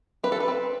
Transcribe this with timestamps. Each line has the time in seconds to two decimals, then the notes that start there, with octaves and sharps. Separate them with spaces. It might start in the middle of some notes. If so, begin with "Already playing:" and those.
0.23 C4 B4
0.32 A4
0.40 B4
0.48 C4